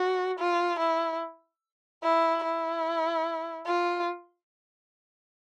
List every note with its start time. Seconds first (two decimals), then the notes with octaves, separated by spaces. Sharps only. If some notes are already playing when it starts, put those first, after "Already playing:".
Already playing: F#4
0.39 F4
0.79 E4
2.03 E4
2.43 E4
3.66 F4